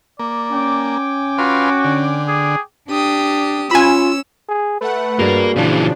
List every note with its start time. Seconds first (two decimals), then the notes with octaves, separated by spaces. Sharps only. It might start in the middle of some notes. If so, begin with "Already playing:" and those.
0.19 A#3 D5
0.52 C#4 G5 G#5 D6
1.38 F4 F#4 B4 C6
1.85 D3
2.28 G#4
2.88 D4 G4 D#6
3.71 C#4 F4 G#5 B5 E6
4.49 G#4
4.81 A3 B4 F#5
5.19 G2 A#3 F#4 G#4 D5
5.56 A#2 C#3 E3 F3 D4